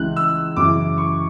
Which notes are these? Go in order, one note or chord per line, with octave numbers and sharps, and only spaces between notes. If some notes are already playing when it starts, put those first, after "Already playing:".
Already playing: C#2 C#3 E3 F#6
E6
F#2 C#3 E3 D6
C#6